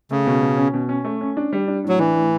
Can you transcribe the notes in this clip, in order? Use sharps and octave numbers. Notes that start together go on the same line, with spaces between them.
C#3 A3
B2
B2
C#4
B2
C#4
A3
C#4
D4
G3
D4
A2 F#3
E3 D4
A2